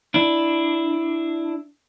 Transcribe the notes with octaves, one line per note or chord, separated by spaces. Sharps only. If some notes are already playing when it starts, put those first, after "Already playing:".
D4 E4